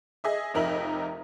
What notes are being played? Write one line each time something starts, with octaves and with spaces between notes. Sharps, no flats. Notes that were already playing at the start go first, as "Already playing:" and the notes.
G#4 D#5 E5
F1 F2 D#4 A#4 E5 F#7